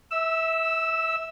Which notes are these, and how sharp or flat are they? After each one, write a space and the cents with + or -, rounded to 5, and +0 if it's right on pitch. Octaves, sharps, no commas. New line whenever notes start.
E5 -25 E6 +0